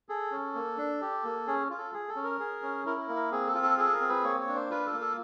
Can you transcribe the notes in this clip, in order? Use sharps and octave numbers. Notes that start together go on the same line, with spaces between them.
G#4 A4
C#4
A#3
D4
G4
A#3
C#4 G#4
F4
A4
G#4
A4
C#4
A#4
G#4
C#4
E4 A#4
A#4
A#3
A#4
C4 G#4
A4
F4
A4
G#4 A4
A#4
C4
B4
A#3 C#5
C#5
D4
C5
F4 B4
A4
A#3
A4